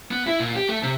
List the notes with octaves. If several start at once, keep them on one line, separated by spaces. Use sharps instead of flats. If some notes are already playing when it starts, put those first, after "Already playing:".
B3
E4
A#2
G4
A3
C3